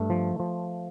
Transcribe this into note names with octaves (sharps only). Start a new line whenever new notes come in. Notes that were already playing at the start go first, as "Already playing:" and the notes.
Already playing: G2 A3
F3
F3